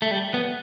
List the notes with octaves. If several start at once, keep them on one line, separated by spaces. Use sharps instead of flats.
A3
G3
B3